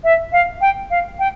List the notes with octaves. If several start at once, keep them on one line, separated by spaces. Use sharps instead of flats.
E5
F5
G5
F5
G5